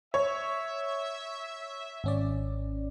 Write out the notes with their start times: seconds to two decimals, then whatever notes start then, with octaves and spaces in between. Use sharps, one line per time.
0.14 C#5 E5
2.04 G#1 C#4 D5